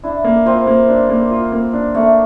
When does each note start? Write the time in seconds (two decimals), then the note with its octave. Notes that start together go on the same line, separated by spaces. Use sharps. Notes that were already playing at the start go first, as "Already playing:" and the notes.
0.03 D4 E4
0.24 A#3
0.46 C4 F4
0.67 A#3
0.89 D4
1.10 A#3
1.31 F4
1.52 A#3
1.73 D4
1.94 A3 A#3